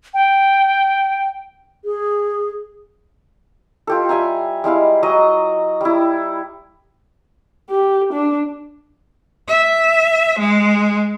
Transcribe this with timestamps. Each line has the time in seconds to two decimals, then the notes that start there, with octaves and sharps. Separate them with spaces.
0.14 G5
1.84 G#4
3.87 F4 G4 A4
4.09 G3 E5 G#5 A#5
4.64 G3 G#3 E4 F5
5.03 F#3 D#5 A#5 D#6
5.81 G3 E4
7.70 G4
8.13 D4
9.48 E5
10.39 G#3